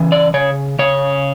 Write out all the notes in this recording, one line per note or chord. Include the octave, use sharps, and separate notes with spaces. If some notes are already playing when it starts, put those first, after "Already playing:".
Already playing: C#3 E3
D5
C#3 C#5
C#3 C#5